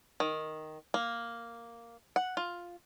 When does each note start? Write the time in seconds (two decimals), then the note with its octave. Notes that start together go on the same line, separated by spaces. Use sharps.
0.20 D#3
0.94 A#3
2.16 F#5
2.37 F4